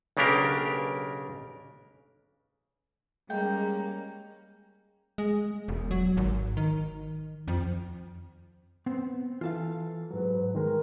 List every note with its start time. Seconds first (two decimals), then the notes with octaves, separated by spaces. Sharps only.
0.17 B1 C#3 A#3 D4 G4 A#4
3.30 G3 G#3 A#3 C#4 G5
5.18 G#3
5.68 E1
5.91 F#3
6.17 G#1
6.57 D#3
7.48 F2
8.86 B3 C4
9.41 E3 F4 A4 F5
10.11 G#2 F#3 B4
10.55 D#3 G#3 A#4